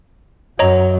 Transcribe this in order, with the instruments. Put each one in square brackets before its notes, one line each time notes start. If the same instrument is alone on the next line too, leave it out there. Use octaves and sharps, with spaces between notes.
[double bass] F#2 F#3 [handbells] C#5 D#5 A#5